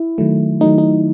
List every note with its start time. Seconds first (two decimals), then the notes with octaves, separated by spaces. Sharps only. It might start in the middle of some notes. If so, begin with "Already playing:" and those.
Already playing: E4
0.18 D#3 F#3 A3
0.61 D#3 F#3 A3 D#4
0.78 D#4